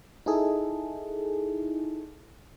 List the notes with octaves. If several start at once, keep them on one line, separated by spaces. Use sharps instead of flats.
D#4 E4 G#4 A4